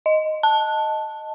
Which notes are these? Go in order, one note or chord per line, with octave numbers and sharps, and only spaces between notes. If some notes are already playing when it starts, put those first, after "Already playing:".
D#5
A5